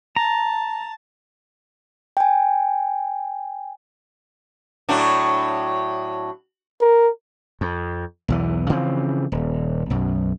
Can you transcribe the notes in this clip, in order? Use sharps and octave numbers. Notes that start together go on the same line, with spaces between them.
A5 A#5
G5 G#5
A2 F#3 D4
A#4
F2
B1 E2 E3
C#3 E3 F3 C4
D#1
B1 F#2